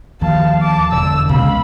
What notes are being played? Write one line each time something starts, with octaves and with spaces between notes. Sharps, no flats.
D#2 F3 F5 A5
A5 D6
E1 D3 E6
C#2 B2 A#3 F5 B5